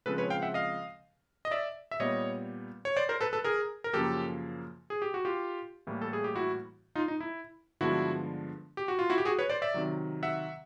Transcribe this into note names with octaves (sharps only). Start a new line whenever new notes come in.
C#3 F3 G#3 C4 A4 B4
B4 C#5
F5 G5
E5 F#5
D#5 F5
D#5
D5 E5
E5
A#2 G3 B3 C#5 D#5
C#5
C5 D5
A#4 C5
A4 B4
A4 B4
G#4 A#4
A#4
F#2 C#3 F3 A#3 G4 A4
G#4
G4
F#4
F4 G4
A2 E3 G3 A#3
A4
G#4
G4
E4 F#4
D#4 F4
D#4
E4
G2 D3 F3 G#3 B3 E4 F#4
G4
F#4
F4
E4 F#4
G4
F#4 G#4
B4 C#5
C5 D5
D5 E5
C3 D#3 F#3
E5 F#5